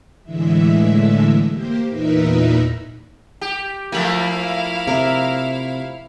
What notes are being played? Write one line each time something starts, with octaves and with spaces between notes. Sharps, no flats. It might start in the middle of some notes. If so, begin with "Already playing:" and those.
A2 D3 E3 G#3 E5
A#3 G4 C5
E2 A#2 D#4 A#4 B4 E5
G4
F3 A3 A#3 E4 F5 G#5 B5
C3 A#4 E5